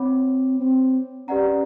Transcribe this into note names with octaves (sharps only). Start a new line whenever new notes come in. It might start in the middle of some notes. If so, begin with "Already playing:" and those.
Already playing: C4 C#5 F#5 B5 D6
C4
C#4 G4 B4 D5 F#5 A#5